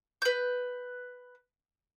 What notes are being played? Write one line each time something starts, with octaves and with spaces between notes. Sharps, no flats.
B4 G6